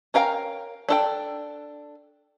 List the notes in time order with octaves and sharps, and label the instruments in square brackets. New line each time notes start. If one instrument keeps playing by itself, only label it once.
[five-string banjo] C#4 A#4 F5 G5 A#5
D4 A4 G5